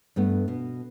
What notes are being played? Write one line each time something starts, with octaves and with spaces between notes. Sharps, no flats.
G2 A3 B3
B2